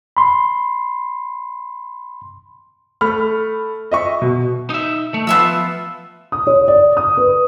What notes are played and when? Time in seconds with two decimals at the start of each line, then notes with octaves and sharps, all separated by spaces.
0.17 B5 C6
3.01 A3 B5 F6
3.92 D#5 E5 C#6
4.22 B2
4.70 D#4 E5
5.14 A3
5.27 F3 B3 F4 E5 E6
6.32 D#6
6.47 C#5
6.68 D5
6.97 D#6
7.17 B4